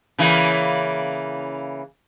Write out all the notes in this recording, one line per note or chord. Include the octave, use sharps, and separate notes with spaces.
C#3 E3 A#3